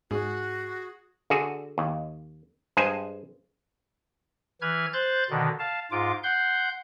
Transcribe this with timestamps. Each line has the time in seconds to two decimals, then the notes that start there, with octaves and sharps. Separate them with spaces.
0.11 G#2 F#4 G#4
1.30 D3 F#4 G#4
1.78 D#2
2.77 G2 G#3 G#4 C5 G#5
4.62 E3 B4 F6 G#6
4.93 C5 F#6 G6 A6
5.30 B2 D3 D#3
5.59 F5 A5
5.91 G#2 F4 D6
6.23 F#5 C6 G6